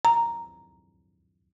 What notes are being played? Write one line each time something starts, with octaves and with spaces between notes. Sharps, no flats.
A#5